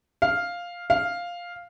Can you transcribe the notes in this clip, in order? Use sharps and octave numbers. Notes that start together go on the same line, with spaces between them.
F5
F5